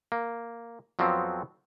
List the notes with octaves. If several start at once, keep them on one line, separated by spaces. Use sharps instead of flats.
A#3
F2 F3 F#3 B3 C4